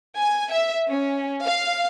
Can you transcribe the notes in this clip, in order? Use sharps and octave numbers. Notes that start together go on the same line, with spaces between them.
G#5
E5
C#4
F5